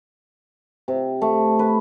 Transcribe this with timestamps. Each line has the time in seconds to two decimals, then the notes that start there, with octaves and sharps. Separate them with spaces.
0.88 C3
1.22 A3
1.59 B4